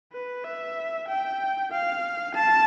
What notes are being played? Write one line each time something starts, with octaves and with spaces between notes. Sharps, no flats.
B4
E5
G5
F5
A5